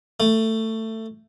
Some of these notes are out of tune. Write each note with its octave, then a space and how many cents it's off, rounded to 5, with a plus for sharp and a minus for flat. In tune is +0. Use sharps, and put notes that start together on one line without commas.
A3 +15